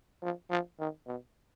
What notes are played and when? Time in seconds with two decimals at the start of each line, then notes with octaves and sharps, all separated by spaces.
0.23 F3
0.50 F3
0.79 D#3
1.07 B2